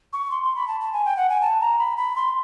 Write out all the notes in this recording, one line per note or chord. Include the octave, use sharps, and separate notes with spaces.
C#6
C6
C6
B5
A5
A5
G#5
G5
F#5
G#5
A5
A#5
B5
B5
C6